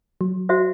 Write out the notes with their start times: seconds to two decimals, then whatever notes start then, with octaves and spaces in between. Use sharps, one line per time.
0.21 F#3
0.49 F#4 C5 E5